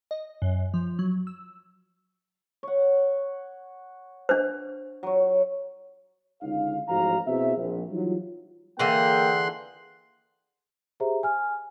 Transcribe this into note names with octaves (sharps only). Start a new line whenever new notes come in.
D#5
F#2
F3
F#3
E6
C#5 F#5
D4 C5
F#3 C#5
C#2 D3 D#4 F5
A1 G#2 F3 F#4 F5 A#5
B2 C4 E4 G#4 E5
A#1
E3 F#3 G3 D#4 F4
D3 E3 A#3 G#4 G5 C6 F#6
G4 G#4 C5 E5 A#5
G#5 F6